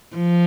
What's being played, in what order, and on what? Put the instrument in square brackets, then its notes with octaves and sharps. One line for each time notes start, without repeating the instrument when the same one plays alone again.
[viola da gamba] F3